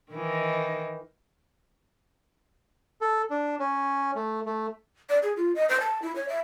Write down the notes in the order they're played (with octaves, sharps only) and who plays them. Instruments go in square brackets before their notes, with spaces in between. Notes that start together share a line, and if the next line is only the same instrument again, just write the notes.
[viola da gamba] D#3 E3 D#4
[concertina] A4
D4
C#4
A3
A3
[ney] D5
G#4
F4
D#5
C5
A5
E4
C#5
E5